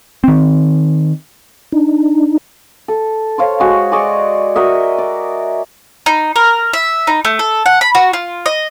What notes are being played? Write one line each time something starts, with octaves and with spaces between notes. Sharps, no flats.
D#3 C4
D4 D#4
A4
C5 C#5 F5
G#3 F#4 G#4
G#4 D5 D#5 C#6
F#4 A#4 D#5 E5
D5
D#4
A#4
E5
D#4
A3
A4
F#5
B5
F#4
F4
D#5